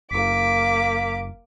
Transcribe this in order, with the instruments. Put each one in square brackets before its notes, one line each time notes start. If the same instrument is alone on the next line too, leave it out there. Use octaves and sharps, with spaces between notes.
[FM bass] F#1 [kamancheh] A#3 D6 [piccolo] B6